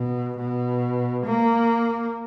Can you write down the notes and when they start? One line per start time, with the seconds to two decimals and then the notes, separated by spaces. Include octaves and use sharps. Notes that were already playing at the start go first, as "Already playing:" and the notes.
Already playing: B2
0.37 B2
1.26 A#3